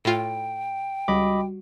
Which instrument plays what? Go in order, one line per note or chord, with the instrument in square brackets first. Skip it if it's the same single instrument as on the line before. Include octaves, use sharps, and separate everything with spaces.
[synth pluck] A2 F4 [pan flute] G5
[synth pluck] C#2 [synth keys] G3 F#4 [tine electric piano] D#5 B5 D6